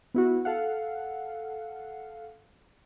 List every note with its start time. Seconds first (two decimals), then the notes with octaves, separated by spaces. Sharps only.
0.14 B3 E4 F#4
0.45 A4 F5 F#5